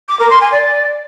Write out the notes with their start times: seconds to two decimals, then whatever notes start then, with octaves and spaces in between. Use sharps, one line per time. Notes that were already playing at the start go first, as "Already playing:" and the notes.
0.09 D6
0.20 A#4
0.30 C6
0.41 G#5
0.52 D5